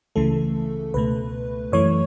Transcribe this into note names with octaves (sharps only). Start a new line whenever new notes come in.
C#2 C#3 E3 A3 A4
C#2 B2 A3 B4
F#2 E3 A3 C#5